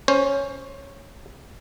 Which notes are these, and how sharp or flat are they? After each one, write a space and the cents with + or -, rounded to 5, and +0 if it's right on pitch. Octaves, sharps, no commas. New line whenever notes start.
C#4 +0 C5 +20